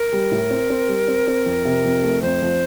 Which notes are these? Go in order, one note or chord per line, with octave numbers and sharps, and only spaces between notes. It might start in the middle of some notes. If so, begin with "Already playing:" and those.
Already playing: A#4
G3
A2
C4
C4
G3
C4
C4
F2
C3
F2
A3
F2 C5
F3